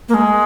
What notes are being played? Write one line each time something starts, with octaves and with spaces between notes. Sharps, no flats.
A#3
G#3